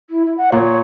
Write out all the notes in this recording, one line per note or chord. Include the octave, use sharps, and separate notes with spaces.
E4
E4
F#5
A#2 C#5